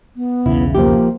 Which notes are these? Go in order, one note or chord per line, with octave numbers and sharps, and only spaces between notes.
B3
B1 E2 C#3 E4
F3 A#3 G4